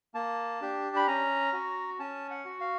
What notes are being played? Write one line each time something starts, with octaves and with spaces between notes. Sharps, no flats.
A#3 A5
D4 G4
B5
C#4 A#5
F#4
C#4 A5
F#5
F#4
F5